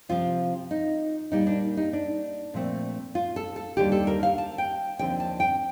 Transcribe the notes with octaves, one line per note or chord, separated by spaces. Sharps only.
C3 F3 C4 F4
D#4
A#2 G3 A#3 D#4
D4
D#4
D4
A#2 F3 A3 C4
F4
A4
A4
D#2 D3 G3 G4
A4
A#4
F5
A5
G5
D#2 D3 F3 C4 G5
A5
G5